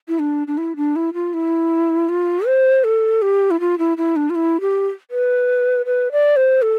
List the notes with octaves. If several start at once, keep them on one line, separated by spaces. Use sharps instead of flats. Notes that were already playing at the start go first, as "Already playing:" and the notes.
E4
D4
D4
E4
D4
E4
F4
E4
F4
C5
A4
G4
E4
F4
E4
E4
D4
F4
E4
G4
B4
B4
D5
C5
A4